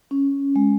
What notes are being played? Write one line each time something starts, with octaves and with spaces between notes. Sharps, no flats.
C#4
G#3